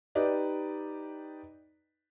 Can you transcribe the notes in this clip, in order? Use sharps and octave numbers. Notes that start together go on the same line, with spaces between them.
D#4 G4 B4 D5 D#5